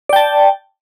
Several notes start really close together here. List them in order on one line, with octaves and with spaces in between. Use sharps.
D5 G5 A5